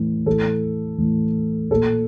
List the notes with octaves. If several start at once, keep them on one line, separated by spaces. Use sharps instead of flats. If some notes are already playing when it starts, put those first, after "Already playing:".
Already playing: A2 E3
A2 E3 A4
A2 E3
A#2 A4